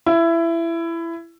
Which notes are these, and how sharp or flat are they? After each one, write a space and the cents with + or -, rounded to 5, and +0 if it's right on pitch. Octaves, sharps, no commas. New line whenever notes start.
E4 +20